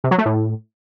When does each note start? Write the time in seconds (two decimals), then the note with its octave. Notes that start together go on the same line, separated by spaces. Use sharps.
0.04 C3
0.11 F#3
0.18 A3
0.25 A2